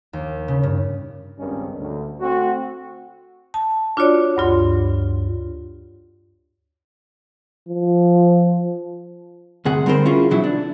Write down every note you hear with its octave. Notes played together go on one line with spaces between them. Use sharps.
D#2
C#3
G2
G#1 C#2 G2 D#3 C#4
D2
A3 C4 F#4
A5
D4 F4 F#4 C#5 D5
D2 G2 F4 C6
F3
D2 G2 C3 G#4 F#5
D3 G3 C4 D#4 A#4 C5
C#4 E4 F4 G#4
B2 E3 F#3 D#4 E4
D4